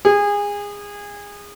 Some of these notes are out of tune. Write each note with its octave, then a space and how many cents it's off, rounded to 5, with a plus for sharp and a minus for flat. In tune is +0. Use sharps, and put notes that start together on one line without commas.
G#4 -25